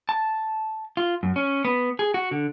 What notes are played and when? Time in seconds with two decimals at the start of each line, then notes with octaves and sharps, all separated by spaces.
0.09 A5
0.97 F4
1.23 F#2
1.36 C#4
1.65 B3
1.99 G#4
2.14 F#4
2.31 D3